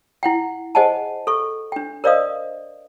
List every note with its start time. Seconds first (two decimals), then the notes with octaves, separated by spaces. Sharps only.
0.23 E4 F#5 G5
0.75 G#4 C5 D#5 F#5 G#5 A5
1.27 A4 C#6
1.72 D4 G5
2.04 A#4 C5 D5 D#5 F5 D#6